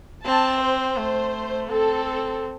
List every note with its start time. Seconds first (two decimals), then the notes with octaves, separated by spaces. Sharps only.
0.24 C4 A5
0.61 C5
0.97 A3
1.69 C4 A4